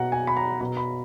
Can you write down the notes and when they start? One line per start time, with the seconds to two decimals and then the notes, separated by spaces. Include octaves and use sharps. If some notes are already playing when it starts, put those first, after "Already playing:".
Already playing: B2 F#5 A#5
0.12 G#5
0.27 B5
0.37 A#5
0.61 B2 A#5
0.77 B5